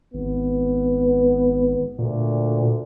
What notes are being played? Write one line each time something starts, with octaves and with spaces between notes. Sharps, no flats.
G#1 B3
D2 A#2